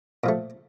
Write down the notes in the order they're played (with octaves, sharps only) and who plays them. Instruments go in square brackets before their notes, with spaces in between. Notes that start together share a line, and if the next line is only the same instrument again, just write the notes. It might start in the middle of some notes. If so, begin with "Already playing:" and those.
[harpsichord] A#2 F3 A3